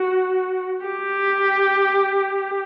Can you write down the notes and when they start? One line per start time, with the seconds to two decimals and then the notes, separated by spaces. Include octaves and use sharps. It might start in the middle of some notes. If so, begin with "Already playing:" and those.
Already playing: F#4
0.85 G4